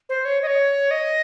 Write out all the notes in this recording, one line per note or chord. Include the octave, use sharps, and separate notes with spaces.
C5
C#5
D#5
C#5
D#5